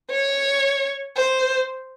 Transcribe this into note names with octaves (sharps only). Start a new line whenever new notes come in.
C#5
C5